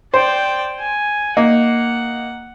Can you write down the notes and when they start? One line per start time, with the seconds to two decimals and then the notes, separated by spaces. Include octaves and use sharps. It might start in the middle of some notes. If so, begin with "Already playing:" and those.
0.14 C5 D5 G5
0.79 G#5
1.37 A#3 D#4 F#5